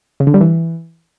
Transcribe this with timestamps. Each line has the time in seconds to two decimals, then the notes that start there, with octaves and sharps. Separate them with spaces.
0.20 C#3
0.27 D3
0.34 G3
0.41 E3